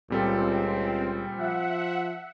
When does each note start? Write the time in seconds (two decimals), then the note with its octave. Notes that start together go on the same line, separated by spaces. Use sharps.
0.10 C#2 A#2 G3 C4 A4
1.38 F3 E5 F#5